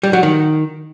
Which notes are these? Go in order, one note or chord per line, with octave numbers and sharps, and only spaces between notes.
G3
F#3
D#3